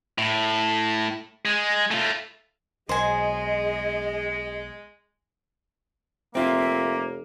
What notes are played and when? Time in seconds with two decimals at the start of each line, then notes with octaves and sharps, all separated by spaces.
0.18 A2
1.45 G#3
1.91 A3 F4
2.89 B1 G#3 G#4 C5 D#5 G#5
6.35 F1 A#3 C4 F4 E5